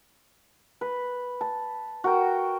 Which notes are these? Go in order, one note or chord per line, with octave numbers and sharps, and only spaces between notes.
B4
A5
F#4 A#4 G5